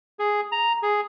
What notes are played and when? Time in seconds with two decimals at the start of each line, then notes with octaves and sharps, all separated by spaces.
0.19 G#4
0.52 A#5
0.83 G#4